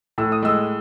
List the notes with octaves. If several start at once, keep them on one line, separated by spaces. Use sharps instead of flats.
A2 E6
D#6
G#3 E6